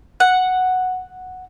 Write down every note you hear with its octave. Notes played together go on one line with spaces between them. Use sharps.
F#5